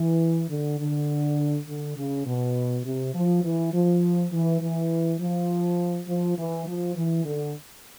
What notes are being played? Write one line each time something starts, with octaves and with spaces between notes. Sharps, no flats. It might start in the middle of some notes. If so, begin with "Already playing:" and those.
Already playing: E3
D3
D3
D3
C#3
B2
C3
F3
E3
F3
E3
E3
F3
F3
E3
F3
E3
D3